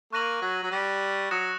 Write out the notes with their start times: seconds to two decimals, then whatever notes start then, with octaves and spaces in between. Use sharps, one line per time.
0.12 A#3 C#6 F#6 A#6 D#7 F#7
0.41 F#3
0.63 F#3
0.71 G3
1.31 F#3 D#6 F#6 A#6 C#7 E7